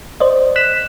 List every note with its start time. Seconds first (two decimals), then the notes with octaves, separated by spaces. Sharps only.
0.20 C5 D5 D#5
0.56 F#6 B6 E7